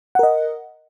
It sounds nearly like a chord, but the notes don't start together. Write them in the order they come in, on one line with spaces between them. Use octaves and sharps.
F#5 A#4 D#5